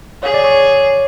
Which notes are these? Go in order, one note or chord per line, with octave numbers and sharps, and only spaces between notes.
G#4 C#5
D5
C#5